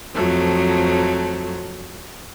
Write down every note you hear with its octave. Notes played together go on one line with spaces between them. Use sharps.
F2 F3 F#3 A3